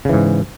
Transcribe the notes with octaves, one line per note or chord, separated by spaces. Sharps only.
G#2 C#3 E3